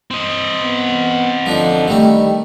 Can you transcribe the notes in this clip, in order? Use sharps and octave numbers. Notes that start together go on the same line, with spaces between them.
C4 D#5
B3
D3 F3 D4 D#4
D#3 G3 A3 G4